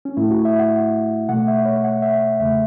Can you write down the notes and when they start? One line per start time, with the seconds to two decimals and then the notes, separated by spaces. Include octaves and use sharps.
0.05 C#4
0.17 A2 A3 E4
0.31 F#4
0.45 E5
0.59 F#5
1.29 B2 A3 F#5
1.48 E5
1.65 C#5
1.84 F#5
2.02 E5
2.39 E2 C#3 A3 E5